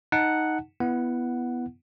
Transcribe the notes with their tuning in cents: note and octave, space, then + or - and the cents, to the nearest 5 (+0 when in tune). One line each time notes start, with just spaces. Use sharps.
D#4 +5 F#5 +0 A5 +0
B3 -5 E4 +15 F#5 +0